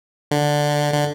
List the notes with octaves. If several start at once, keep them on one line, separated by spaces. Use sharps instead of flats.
D3
D3